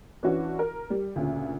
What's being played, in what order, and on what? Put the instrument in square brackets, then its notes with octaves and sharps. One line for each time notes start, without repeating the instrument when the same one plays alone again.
[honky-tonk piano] E3 C#4 D4 E4 F#4
A#4
G3
D2 A#2 C#3